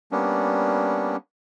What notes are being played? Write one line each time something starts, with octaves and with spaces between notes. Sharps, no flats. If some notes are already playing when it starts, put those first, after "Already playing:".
G3 A#3 B3 C#4 D4